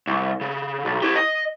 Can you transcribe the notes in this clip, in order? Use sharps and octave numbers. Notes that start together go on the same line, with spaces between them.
C2
C#3
B1
E4 G4
D#5